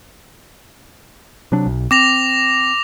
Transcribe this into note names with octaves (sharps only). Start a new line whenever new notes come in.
C3 F#3 D4
B1
C4 D6 A#6 F7